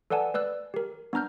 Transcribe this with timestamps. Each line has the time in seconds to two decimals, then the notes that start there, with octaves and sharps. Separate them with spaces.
0.10 A4 B4 D5 F#5 G#5 A5
0.34 B4 D5 E6 F#6
0.74 G4 A#4
1.13 B3 D4 A#5 F6 G6